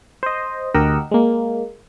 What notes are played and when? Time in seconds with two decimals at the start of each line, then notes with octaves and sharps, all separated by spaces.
0.23 C5 D#5
0.74 D2 G4 A#4 D#5 F#5 E6
1.11 G#3 A#3